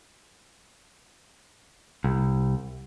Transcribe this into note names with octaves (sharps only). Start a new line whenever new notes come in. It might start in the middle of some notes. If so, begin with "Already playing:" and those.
C2